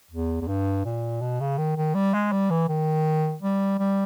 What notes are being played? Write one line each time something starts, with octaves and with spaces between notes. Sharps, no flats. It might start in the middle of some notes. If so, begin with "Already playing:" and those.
E2
E2
G2
A#2
B2
C#3
D#3
D#3
G3
G#3
G3
E3
D#3
G3
G3